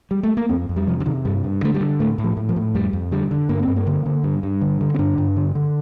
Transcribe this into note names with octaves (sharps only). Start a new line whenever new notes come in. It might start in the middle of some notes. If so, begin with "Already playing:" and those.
G3
A3
A#3
F2 C4
F2
G3
C3 F3
D3
C3 D#3
G2 G3
G2
D3 A3
G3
D3
A2 A3
A2
F3
A2
F3
A2
F2 G3
F2
D3 G3
D3
G2 A#3
C4
G2
A#3
D3
D3
G2
G2
D3
D3
C4
G2 D4
G2
D3
D3